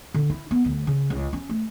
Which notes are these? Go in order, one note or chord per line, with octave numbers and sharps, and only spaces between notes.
D3
E4
B3
D2
C#3
C#2
C#4
A3